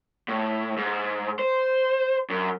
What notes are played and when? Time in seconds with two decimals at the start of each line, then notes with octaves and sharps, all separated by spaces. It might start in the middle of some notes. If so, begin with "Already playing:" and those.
0.28 A2
0.77 G#2
1.39 C5
2.30 F#2